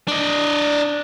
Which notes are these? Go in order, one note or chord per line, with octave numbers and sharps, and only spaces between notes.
D4 D#5